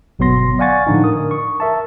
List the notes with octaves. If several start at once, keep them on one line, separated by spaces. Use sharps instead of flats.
G1 B2 F#3 B3 C6 A#6
D5 F5 F#5 G#5 C#6 A6
A2 D3 F3 D4 D#4
A#4 D#6
C#6
A#4 E5 A5